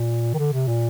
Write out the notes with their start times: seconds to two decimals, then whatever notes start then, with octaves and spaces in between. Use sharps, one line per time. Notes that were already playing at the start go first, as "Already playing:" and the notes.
Already playing: A#2
0.34 D#3
0.38 D3
0.52 C3
0.68 A#2